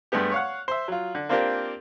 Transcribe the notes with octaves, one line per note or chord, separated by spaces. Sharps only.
G2 G#3 A3 B3 G4
C#5 F5 F#5
C5 E5
F#3 F4
D3
A#3 C4 D4 F4 G4 A#4